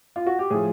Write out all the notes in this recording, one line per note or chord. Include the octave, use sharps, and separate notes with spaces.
F4
F#4
G4
A2 F3 G#4